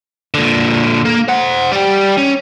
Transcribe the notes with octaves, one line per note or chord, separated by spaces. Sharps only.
A#2 D3
A#3
C5 F#5
G3 G4
C#4